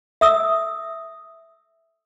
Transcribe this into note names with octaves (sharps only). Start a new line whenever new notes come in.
E5 D#6 E6